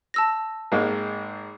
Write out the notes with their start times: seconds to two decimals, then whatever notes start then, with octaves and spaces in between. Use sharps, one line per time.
0.14 A5 E6 A#6
0.72 G#1 G#2 A#3